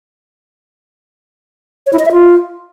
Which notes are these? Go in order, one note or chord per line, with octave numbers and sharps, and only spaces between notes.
C#5
E4
D#5
E5
F4